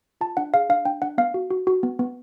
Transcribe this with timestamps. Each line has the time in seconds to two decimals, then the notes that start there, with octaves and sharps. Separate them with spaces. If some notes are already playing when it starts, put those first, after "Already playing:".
0.21 F4 A5
0.37 D4 F#5
0.54 G#4 F5
0.69 D4 F5
0.85 D4 G5
1.02 D4 F#5
1.18 B3 F5
1.34 F#4
1.51 F#4
1.67 F#4
1.83 B3
1.99 B3